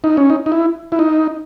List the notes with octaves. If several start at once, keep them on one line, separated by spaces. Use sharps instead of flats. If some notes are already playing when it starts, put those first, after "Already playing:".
D#4
C#4
D#4
D#4
E4
E4
D#4